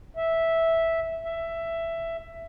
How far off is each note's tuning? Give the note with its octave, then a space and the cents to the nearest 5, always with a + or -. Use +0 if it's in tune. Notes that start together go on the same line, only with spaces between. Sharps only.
E5 -5
E5 +10